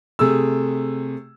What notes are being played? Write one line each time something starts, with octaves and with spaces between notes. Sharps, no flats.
C3 A3 G#4 E6